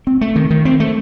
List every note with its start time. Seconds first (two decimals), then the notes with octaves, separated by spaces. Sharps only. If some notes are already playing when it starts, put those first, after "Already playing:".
0.07 C4
0.21 A3
0.36 D#3
0.50 D#3
0.65 C4
0.80 A3